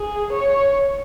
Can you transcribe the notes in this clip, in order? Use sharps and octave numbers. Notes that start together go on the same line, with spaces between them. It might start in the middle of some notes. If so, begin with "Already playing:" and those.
Already playing: G#4
C#5